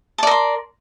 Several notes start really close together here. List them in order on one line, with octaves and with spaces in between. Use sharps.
A5 D5 A#4 C6